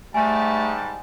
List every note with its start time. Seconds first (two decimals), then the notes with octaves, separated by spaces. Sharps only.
0.14 G#2 G3 A3 G#5 A5